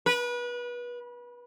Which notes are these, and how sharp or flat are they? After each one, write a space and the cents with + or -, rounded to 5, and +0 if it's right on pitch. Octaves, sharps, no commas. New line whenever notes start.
B4 -30